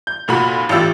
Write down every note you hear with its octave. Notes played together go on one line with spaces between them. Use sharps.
G6
F1 A#2 F#4 B5
A1 F4 G4 E6 A6